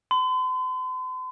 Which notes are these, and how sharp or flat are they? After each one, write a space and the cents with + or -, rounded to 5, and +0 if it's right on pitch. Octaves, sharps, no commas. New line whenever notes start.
C6 -45